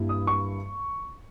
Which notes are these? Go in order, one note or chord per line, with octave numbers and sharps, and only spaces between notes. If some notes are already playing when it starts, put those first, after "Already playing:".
Already playing: G2 G3 A#3 E4
D#6
C#6